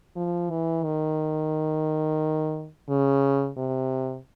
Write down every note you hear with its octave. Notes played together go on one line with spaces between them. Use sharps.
F3
E3
D#3
C#3
C3